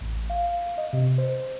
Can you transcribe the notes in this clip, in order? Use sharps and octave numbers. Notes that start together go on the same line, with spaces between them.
A1
F5
D#5
C3
C5